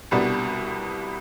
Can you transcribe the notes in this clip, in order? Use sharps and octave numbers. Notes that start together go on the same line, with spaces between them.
C2 B2 G3 B3 D4